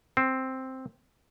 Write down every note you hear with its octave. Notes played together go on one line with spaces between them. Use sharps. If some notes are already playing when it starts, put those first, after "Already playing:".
C4